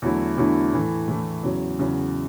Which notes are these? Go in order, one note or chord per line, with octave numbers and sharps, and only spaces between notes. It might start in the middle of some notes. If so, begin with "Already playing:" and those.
E2 D3 F#3 A3 E4
E2 D3 F#3 A3 E4
A2 E3 A3
A2 E3 A3
E2 C#3 F#3
E2 C#3 F#3